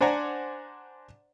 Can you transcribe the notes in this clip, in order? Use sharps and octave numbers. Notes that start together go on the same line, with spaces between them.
D4 C5 D5 F#5 G#5 A#5